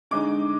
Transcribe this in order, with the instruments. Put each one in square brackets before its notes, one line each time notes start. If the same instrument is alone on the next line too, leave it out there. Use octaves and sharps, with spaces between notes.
[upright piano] D3 G#3 D#4 D6